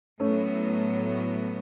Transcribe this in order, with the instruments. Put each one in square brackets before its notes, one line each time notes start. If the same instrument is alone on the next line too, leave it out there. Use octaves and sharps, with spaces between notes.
[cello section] A2 F#3 B3 [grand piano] A3 C#4